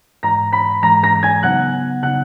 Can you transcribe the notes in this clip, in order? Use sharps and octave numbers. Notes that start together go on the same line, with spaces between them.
G#2 E3 G#3 A#5 A#6
B5 B6
G#2 E3 G#3 A#5 A#6
A#5 A#6
G#5 G#6
C#3 F#3 B3 D#4 F#5 F#6
C#3 F#3 B3 D#4 F#5 F#6